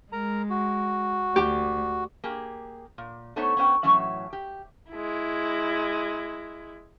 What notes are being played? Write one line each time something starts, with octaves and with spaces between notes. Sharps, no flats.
G#3 A#4 A#5
F#4
D2 G4
A#3 G4 G#4
A#2
A3 B3 D#4 C5 C#5 E5
B3 C#4 C5 E5 G5
A2 E3 F#3 C#4 E5
G4
G#3 E4